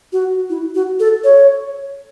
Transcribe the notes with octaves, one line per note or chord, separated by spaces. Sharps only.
F#4
E4
F#4
A4
C#5